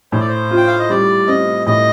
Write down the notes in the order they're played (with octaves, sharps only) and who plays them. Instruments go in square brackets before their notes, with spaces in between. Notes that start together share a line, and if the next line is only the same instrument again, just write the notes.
[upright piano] A2 [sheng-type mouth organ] C5
[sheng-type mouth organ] D5
C5
[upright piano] F4
[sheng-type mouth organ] G5
F5
D#5
[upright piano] G3 [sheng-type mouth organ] D5
[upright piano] C4 [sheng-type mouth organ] D#5
[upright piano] A2 [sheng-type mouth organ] D#5